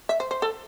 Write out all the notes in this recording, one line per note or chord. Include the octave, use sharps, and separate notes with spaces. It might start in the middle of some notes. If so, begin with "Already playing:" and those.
E5
C5
C5
A4